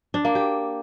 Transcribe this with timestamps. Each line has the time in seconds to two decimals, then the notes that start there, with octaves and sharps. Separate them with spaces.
0.14 D4
0.25 A#3
0.35 G4